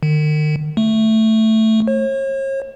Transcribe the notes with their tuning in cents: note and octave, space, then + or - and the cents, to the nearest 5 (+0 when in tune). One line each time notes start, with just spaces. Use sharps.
D#3 -40
A3 +5
C#5 -45